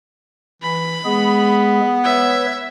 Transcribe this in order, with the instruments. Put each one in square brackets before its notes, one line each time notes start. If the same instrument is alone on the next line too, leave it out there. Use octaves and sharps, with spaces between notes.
[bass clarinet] E3 [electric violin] B5
[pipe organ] G#3 G#4 [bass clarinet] B3
[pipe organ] B4 C#5 [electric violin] E5